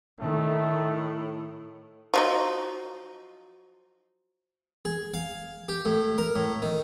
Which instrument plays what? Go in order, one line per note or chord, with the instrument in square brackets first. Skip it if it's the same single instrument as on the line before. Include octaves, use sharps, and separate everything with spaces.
[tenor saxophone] A2 [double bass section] D#3 [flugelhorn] A3
[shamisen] F3 F#3 D#4
[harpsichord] G#4
F5
G4
A2
A#4
A2
D#3